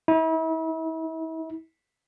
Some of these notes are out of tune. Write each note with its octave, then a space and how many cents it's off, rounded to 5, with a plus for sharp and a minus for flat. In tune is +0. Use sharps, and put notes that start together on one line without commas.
E4 -40